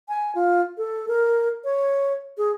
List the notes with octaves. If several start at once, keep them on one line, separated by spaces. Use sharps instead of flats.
G#5
F4
A4
A#4
C#5
G#4